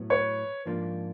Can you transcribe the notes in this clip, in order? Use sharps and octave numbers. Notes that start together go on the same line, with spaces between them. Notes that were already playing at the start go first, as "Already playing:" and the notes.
Already playing: A2 F#3 B3
B4 C#5
G#2 F3 A#3 D4 F4